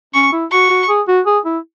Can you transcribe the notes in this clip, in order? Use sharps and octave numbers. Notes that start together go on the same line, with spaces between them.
C#4 C#6
E4
F#4 C#6
F#4
G#4
F#4
G#4
E4